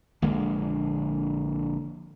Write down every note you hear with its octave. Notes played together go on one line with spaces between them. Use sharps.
A#1 D3 G#3 A#3